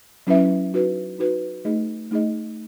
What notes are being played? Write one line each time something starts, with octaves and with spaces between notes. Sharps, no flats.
F#3 C#4 E4 B4 E5
D#4 F#4 B4
D#4 F#4 B4
A3 D#4 G#4 D#5
A3 D#4 G#4 D#5